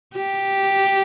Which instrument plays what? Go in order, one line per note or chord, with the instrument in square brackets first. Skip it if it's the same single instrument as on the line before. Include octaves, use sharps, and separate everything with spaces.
[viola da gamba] G4